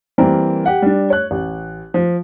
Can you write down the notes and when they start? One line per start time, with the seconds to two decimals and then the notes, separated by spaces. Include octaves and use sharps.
0.18 E3 G3 A#3 C4 A#4
0.66 G4 F#5
0.82 G3 D4
1.10 C#5 F#6
1.31 A1
1.94 F3